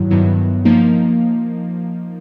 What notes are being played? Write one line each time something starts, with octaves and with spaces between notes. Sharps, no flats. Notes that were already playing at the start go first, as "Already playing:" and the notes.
Already playing: G2 D#3 F#3 E4
G2 D#3 F#3 B3 E4
F3 A#3 D#4